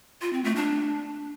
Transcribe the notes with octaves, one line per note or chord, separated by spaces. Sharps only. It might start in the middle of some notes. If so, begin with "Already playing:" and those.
F4
C4
A3
D4